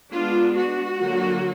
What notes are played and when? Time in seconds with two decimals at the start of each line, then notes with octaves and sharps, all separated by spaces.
0.12 G#3 B3 D4 F4
0.55 F#4
0.98 D3 F#3 A#3